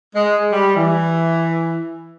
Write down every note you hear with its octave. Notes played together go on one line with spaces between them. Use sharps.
G#3
G3
E3